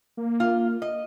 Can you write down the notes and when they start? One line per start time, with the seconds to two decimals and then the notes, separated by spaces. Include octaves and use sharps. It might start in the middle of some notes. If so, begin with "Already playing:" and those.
0.17 A#3
0.40 F4
0.82 D#5